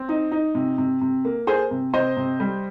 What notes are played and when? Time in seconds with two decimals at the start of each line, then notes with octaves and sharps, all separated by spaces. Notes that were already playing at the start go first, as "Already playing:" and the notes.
Already playing: C4
0.09 D#4
0.32 D#4
0.55 C3
0.78 C3
1.01 C3
1.25 A#3
1.47 A#3 G#4 C5
1.71 C3
1.93 C3 C5 D#5
2.17 C3
2.40 G3